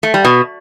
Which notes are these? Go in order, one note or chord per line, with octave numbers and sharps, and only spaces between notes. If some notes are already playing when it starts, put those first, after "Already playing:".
A3
G3
B2